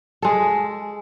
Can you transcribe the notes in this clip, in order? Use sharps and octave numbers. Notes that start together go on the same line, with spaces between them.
G#3 A4